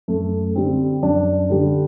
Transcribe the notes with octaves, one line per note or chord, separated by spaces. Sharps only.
F#2 A3
D3 G3 C4
F#2 D4
D3 G3